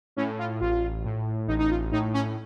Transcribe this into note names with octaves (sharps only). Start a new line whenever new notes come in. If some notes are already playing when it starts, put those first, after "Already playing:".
A2 C#4
F4
A1 F4
A2
A1 D#4
D#4
F4
A2 D#4
C#4